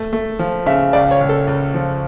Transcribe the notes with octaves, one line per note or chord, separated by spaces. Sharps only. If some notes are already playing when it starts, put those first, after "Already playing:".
Already playing: A3
A3
F3
C#3 E5
C#2 D5
C#5
C#2
A4
C#2
F3